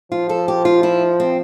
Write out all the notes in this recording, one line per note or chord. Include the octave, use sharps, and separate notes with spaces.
F3 F4
A4
G4
F4
E4
C4